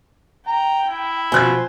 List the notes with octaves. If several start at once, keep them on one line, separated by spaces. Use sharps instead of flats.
G5 A#5
E4
B2 F3 C5 G#5 F#6 G#6